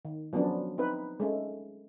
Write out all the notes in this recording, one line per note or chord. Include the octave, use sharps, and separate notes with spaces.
D#3
F3 F#3 B3 C#4 D4
C4 D#4 B4
G#3 A3 C#4